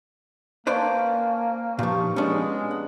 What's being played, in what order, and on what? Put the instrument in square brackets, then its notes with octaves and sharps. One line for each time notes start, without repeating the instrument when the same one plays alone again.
[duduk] A#3 [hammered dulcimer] C#4 A5 [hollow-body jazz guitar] B4 C5 D5
[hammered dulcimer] G2 D#4 C#6 [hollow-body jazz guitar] A#2 F3
[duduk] G#3 [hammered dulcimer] B3 G#4 [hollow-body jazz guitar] C#4 D4
[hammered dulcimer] F#5